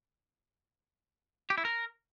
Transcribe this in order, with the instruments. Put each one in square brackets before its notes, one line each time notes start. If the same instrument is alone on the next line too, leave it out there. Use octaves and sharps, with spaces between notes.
[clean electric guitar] G4
E4
A#4